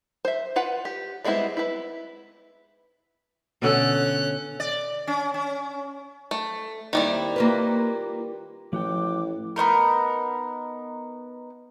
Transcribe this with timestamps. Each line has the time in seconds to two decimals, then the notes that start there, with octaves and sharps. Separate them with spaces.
0.25 C5 E5
0.56 F4 B4 F#5
0.85 G4
1.24 G3 G#3 B3 C4 E4
1.57 E4 B4
3.62 B2 D3 C#4 A4 F#6
4.60 D5
5.07 C#4
5.34 C#4
6.31 A3
6.93 D#2 D#3 G3 C4 E4 E5
7.36 A#3 F4 B4
8.73 A1 A2 F3 F#4 G5 D6
9.56 B3 C#4 D#4 A#4